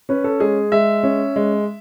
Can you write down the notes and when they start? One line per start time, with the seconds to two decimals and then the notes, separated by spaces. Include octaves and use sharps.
0.09 C#4 B4
0.24 A4
0.40 G#3 G#4
0.72 G#3 E5
1.03 C#4
1.36 G#3